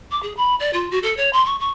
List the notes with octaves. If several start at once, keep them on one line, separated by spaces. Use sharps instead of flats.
D6
G#4
B5
D5
F4
F#4
A4
C#5
C6
C#6
C#6